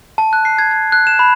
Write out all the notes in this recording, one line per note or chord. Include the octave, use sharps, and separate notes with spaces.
A5
F#6
C7
G#6
G#6
F#6
E7
B5